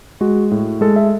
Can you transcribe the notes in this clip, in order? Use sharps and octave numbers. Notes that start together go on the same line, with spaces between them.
G#3 F#4
A2
G#3 A4
E5